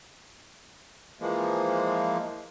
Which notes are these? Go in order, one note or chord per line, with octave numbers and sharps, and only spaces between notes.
E3 F3 G#3 A#3